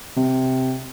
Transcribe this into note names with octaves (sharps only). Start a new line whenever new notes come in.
C3